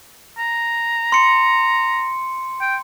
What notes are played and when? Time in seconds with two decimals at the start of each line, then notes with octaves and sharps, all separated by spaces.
0.38 A#5
1.12 C6 C#7
2.61 G5